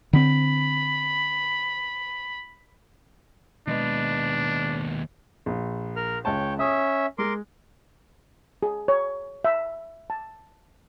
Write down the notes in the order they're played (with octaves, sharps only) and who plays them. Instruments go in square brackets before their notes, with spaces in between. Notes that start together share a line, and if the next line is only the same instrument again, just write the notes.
[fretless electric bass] D3 C4 [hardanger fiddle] B5
[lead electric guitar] D#2 B4 [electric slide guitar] B2 G#3 D#5 [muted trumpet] D4
[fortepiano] A#1
[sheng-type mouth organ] A#4 F6
[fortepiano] C#2 A5 [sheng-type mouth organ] C#5 G5
[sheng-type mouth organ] C#4 E5 [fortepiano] D#6
[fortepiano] G#3 [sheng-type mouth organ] A#4 C6 D6
[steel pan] G#4
C#5
E5
A5